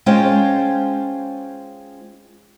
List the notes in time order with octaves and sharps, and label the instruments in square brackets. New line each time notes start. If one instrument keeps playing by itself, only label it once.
[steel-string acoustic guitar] G#3 C#4 F4 C5 G5